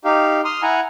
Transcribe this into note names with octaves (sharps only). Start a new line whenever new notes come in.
D#4 G4 F5
C6 D#6 F6
E4 F#5 G#5 A#5